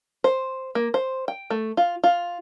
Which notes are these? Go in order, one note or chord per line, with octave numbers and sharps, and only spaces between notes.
C5
A#3
C5
G5
A3
F4
F4